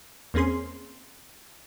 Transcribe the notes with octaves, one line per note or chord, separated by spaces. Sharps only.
E2 A#3 C4 C#4 G#4 C6